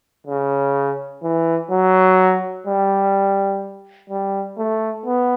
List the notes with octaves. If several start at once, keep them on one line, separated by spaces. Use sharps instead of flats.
C#3
E3
F#3
G3
G3
A3
B3